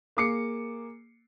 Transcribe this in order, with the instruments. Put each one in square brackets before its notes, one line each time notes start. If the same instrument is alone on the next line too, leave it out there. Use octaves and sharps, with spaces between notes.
[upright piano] A#3 G#4 D6 C7 C#7